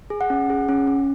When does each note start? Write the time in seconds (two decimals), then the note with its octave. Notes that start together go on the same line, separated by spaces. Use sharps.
0.10 G#4
0.21 F#5
0.30 C#4
0.50 G#4
0.69 C#4
0.87 C#4